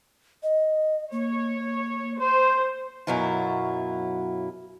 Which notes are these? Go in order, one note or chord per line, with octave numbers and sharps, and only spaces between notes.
D#5
A#3 C#5
C5
F#2 B2 F#3 E4 F4